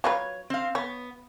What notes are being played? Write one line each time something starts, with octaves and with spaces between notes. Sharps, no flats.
F#3 F4 B4 C#5
C4 F5
B3 C#5